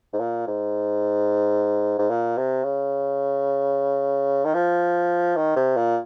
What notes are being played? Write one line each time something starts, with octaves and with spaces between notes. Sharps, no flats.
G#2
A#2
G#2
G#2
A#2
C3
C#3
D#3
F3
D#3
C3
A#2